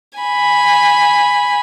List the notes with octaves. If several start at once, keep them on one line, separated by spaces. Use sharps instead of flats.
G#5 B5